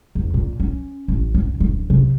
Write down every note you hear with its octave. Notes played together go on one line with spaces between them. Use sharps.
E2
A#2
C#4
A1
F#2
D1
C3